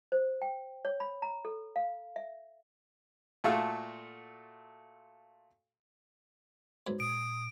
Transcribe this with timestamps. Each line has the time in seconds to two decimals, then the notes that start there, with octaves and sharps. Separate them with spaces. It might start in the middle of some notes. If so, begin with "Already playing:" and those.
0.12 C5
0.42 G5
0.85 C#5
1.00 B5
1.22 A#5
1.45 A4
1.76 F5
2.16 E5
3.44 A#2 A3 F4 F#4 A4 F5
6.87 G#2 F#3 B3
7.00 A#2 D#6 D7